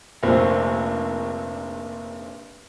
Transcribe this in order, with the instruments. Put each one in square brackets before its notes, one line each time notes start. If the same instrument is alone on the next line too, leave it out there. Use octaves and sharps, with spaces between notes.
[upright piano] F1 A#1 A#2 C4